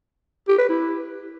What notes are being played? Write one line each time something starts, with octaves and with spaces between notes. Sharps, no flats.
G4
B4
E4